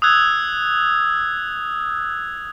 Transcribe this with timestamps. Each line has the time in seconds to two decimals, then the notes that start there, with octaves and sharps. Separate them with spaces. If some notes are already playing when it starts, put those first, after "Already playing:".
0.02 D#6 E6 F#6 G#6